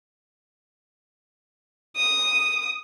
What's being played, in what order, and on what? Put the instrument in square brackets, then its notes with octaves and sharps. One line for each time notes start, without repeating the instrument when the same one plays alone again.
[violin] D#6